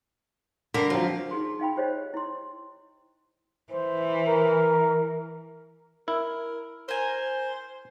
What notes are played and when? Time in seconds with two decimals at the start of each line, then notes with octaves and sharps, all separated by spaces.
0.74 D3 G3 A#4 B6 C7
0.90 F3 F#3 C4 F4
1.31 D#4 G#4 C6
1.60 D#4 F5 G5 B5
1.76 F4 G4 C5 C#5 D#5
2.14 E4 C6
3.73 E3 C5
4.27 A#4
6.08 E4 A#4
6.89 A#4 C5 G#5